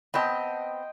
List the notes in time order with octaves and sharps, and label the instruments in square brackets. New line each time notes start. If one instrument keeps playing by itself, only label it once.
[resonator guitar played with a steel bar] B3 C4 A5 [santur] D#5 G5 C6